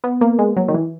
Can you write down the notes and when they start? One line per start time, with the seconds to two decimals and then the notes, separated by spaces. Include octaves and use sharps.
0.04 B3
0.21 A#3
0.39 G#3
0.57 F#3
0.68 D#3
0.74 E3